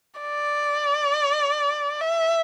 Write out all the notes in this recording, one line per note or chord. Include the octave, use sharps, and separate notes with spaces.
D5
E5